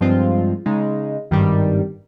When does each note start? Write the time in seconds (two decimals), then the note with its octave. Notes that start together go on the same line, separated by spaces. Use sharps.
0.01 G2 F3 G#3 C4 F4
0.66 C#3 G#3 D#4
1.31 G#1 G2 D#3 G3